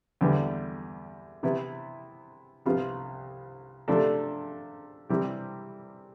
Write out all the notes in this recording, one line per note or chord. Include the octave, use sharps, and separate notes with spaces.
E2 D3 G3 B3
C3 E3 B3 E4
C2 C3 F3 B3 F4
C3 F3 A3 D4 A4
C3 E3 G3 C4 G4